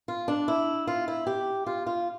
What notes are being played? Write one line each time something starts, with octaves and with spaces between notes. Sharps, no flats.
F4
D4
E4
F4
E4
G4
F4
F4